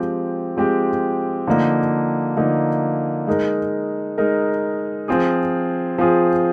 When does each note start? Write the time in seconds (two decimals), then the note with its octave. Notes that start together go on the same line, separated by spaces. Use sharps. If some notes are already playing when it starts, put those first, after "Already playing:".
Already playing: F3 G#3 C4 G4
0.57 F3 G#3 C4 G4
1.47 D3 F3 A#3 D#4
2.37 D3 F3 A#3 D#4
3.27 G#3 D#4 A#4
4.18 G#3 D#4 A#4
5.08 F3 C4 F4 G#4
5.98 F3 C4 F4 G#4